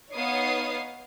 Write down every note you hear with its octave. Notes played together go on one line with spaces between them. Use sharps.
B3 D#4 C#5 F5 D#6 C7